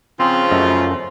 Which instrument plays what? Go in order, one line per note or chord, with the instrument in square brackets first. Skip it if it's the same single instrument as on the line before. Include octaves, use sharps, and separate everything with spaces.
[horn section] C#3 F3 [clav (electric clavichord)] C4 [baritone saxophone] F4
[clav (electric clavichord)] F#2 A3 D#5